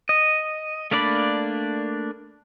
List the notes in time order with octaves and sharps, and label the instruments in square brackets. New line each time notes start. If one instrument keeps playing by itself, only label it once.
[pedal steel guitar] D#5
A3 A#3 D4 D5 B5